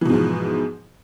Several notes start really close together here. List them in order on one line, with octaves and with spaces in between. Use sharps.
E3 B2 G#2 F3